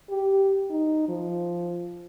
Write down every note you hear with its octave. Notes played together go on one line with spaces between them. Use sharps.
G4
D#4
F3